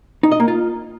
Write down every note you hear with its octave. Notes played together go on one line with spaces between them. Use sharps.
D#4
D#5
A#3
F4